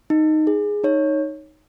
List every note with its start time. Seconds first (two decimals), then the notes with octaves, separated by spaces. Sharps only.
0.10 D#4
0.47 G#4
0.83 D#4 C#5